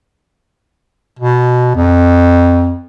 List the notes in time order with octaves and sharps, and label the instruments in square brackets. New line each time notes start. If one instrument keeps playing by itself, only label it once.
[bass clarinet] B2
F2